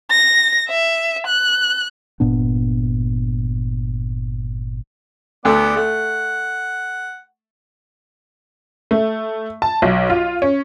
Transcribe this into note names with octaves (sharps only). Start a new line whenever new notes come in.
A#6
E5
F#6
G1 A#2 B3 D4
D2 B3 A4 D5 F#5
A3 F#5
A3
A5
B1
F4
C#4